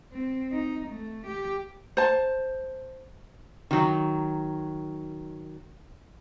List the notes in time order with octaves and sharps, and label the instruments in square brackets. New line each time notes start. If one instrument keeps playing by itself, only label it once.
[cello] C4
D#4
A3
G4
[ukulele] C5 A5
[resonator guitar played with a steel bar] D#3 F#3